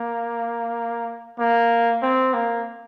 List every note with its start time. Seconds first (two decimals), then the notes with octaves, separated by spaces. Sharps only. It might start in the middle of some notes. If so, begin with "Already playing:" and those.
Already playing: A#3
1.39 A#3
2.02 C4
2.33 A#3